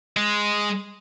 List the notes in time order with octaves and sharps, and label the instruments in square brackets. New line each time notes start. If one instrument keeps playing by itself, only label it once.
[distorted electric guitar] G#3